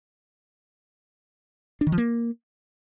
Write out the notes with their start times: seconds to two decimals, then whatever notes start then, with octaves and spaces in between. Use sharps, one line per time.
1.81 D4
1.87 D#3
1.92 F3
1.98 A#3